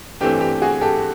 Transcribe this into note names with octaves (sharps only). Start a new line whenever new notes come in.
G2 E3 A3 C4 G4
G4
F#4 G#4
G4 A4